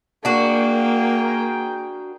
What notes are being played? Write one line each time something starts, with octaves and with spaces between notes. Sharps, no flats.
A#3 D4 F#4 G#4 A#4 G5